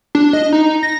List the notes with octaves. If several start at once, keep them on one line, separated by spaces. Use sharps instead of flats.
D4
D#5
D#4
A#6